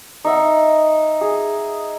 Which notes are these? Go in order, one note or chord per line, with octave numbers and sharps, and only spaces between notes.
D#4 E5 F#5
G#4